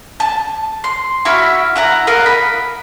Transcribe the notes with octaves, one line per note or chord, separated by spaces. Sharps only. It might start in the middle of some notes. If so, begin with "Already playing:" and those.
A5
C6
E4 F#4 B5 F6
E4 F#5 A#5
A#4 D#5 F5 F#5
B5